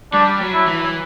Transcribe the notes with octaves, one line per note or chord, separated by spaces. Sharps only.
G3 D4
F#3
E4
E3